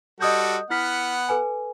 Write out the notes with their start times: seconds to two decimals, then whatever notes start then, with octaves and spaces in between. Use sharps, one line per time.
0.20 G3 F#4 A4 D#5 D#6 G6
0.70 B3 E4 F#5 F6 B6
1.29 A4 B4 G#5